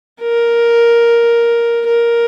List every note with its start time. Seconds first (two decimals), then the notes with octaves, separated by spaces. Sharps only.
0.21 A#4
1.87 A#4